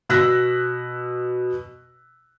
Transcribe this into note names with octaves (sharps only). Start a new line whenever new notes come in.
B2 E6 F#6 A#6 B6